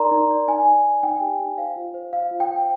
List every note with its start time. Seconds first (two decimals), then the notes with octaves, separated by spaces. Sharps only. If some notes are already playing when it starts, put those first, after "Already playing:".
Already playing: D#4 A#4 D5 A#5 C6
0.11 D#4
0.30 D5
0.48 D#4 G#5
0.66 D5
0.85 D5
1.03 D#4 G5
1.21 G4
1.40 D#4
1.58 C5 F5
1.76 F4
1.94 C5
2.13 C5 F5
2.31 F4
2.40 G5
2.50 C5